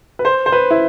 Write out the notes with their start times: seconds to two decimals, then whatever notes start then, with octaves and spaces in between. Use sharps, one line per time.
0.19 B4
0.25 C5
0.46 C5
0.52 B4
0.71 E4